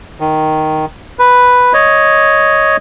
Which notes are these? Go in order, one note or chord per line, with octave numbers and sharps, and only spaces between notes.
D#3
B4
C#5 D#5